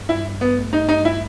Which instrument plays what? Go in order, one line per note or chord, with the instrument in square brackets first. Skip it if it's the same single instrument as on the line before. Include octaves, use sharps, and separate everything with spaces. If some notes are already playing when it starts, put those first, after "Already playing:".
Already playing: [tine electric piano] G2
[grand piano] E4
[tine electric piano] G2
A1
[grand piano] B3
[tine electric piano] A3
[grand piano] D#4
[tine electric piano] G2
[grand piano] D#4
[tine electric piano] G2
[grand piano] E4